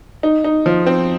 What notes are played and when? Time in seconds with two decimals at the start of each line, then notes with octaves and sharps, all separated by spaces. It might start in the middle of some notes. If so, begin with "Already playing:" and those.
0.23 D#4
0.44 D#4
0.66 F3
0.87 C4